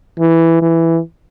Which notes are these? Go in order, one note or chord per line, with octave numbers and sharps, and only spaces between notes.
E3
E3